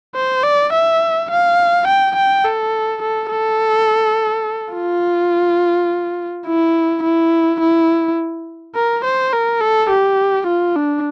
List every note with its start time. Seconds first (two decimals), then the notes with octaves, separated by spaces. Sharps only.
0.15 C5
0.44 D5
0.73 E5
1.30 F5
1.87 G5
2.16 G5
2.45 A4
3.02 A4
3.31 A4
4.74 F4
6.46 E4
7.03 E4
7.60 E4
8.75 A#4
9.05 C5
9.33 A#4
9.61 A4
9.90 G4
10.47 F4
10.76 D4